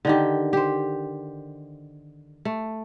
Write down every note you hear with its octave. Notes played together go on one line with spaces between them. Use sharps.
D3 D#3 G4
G4 C5
A3